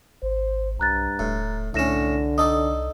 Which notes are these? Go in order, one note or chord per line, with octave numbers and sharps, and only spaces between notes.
G#1 C5
B1 G2 A#5 F#6 A6
D#1 A2
C2 A2 D3 C#4 E4 A#6 E7
D#4 A4 D5 D#6